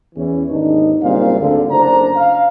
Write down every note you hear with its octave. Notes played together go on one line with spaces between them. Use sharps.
E2 E3 C#4
G#1 D#2 D4 D#4
F#1 A#2 G3 C4 F5
D2 G#2 D3
F#1 D4 C5 A#5
F5